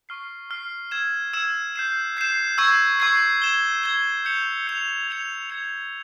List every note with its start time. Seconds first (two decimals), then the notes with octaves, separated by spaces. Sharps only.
0.09 C#6 F6 C7
0.50 C#6 F6 C7
0.91 E6 G#6 E7
1.33 E6 G#6 E7
1.76 G6 C7 E7
2.17 G6 C7 E7
2.58 C#6 E6 G#6 C7
3.00 C#6 E6 G#6 C7
3.42 G#6 E7 G7
3.83 G#6 E7 G7
4.25 G6 C#7 F7
4.67 G6 C#7 F7
5.08 G#6 C#7 F7
5.50 G#6 C#7 F7